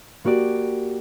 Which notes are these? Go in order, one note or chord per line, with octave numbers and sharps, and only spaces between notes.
A#3 F#4 G4 D5